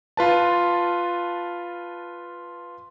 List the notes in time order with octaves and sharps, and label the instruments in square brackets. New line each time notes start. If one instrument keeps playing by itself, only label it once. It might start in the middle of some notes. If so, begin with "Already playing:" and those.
[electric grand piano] F4 B4 A5